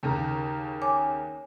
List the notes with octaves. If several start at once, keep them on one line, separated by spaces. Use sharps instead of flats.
D#2 C#3 A#5
C#5 G#5 D6